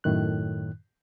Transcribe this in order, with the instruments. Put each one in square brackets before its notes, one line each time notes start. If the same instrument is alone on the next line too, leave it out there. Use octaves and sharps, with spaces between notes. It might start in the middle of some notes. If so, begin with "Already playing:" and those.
[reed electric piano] F#2 A2 D#3 F#6